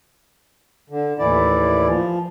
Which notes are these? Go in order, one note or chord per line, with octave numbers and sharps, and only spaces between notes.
D3
D#2 A2 E3 E4 D5
F3